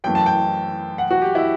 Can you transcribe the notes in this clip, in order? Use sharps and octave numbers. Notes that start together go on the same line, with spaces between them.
F#2 E3 A3 G5
A5
G5
F#5
F#4
G4
E4